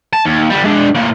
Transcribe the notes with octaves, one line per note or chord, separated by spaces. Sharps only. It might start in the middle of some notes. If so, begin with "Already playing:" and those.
A5
D#2
D3 G3
G#3 D4
A2 A#3